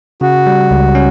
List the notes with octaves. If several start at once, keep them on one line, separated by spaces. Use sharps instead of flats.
C#3 F#4
G3
C#2
C#4